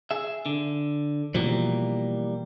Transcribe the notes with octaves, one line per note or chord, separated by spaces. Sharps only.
G#4 E5
D3
B2 E3 F3 G3 A#3